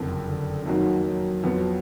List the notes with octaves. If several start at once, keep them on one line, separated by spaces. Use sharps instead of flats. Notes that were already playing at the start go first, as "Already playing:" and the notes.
Already playing: F#1 F2 D3
D3
F2 D#3 F#3 A#3 D#4 F#4
F#3
F2 F3 B3